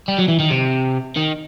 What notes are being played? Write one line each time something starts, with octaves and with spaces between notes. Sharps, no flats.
G3
F#3
E3
D#3
C3
D#3